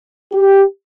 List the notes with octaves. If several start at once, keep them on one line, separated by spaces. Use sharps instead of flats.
G4